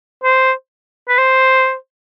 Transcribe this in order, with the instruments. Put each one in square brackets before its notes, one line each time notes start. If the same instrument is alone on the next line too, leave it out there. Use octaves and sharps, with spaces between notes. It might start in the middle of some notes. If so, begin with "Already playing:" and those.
[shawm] C5
B4
C5